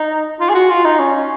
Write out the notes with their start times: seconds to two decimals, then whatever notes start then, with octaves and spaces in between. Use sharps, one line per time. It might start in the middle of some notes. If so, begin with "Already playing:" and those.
Already playing: D#4
0.40 F4
0.50 G#4
0.55 F#4
0.70 F4
0.85 D#4
0.99 C#4